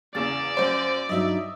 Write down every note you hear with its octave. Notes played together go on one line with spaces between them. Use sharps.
E2 C#3 A#3 D5 A6
F#2 C5
G2 F#3 D#4 D#5 E5